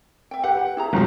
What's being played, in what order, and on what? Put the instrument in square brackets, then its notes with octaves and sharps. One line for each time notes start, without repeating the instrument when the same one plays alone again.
[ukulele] E5 G5
[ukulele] G4 B4 [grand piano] F#5
[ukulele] E4 G#4 A#5
[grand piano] G1 F#2 B2 [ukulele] F4